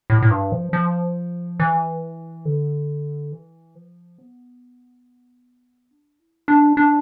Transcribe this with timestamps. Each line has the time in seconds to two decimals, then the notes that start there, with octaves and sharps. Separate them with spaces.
0.10 A2
0.22 A2
0.31 G2
0.52 F3
0.73 F3
1.60 E3
2.45 D3
3.32 E3
3.75 F3
4.18 B3
5.91 D4
6.19 E4
6.48 D4
6.77 D4